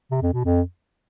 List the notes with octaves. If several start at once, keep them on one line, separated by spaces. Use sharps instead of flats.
C3
F2
B2
F2